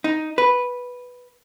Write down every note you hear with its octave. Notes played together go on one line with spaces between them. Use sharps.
D#4
B4